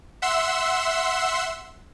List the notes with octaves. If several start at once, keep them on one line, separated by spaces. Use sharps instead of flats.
E5 F#5 C6 E6